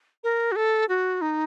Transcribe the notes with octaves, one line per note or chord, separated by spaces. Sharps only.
A#4
F#4
A4
F#4
D#4